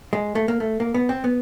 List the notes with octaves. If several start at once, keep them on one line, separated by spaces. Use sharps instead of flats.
G#3
A3
A#3
A3
A#3
B3
C4
B3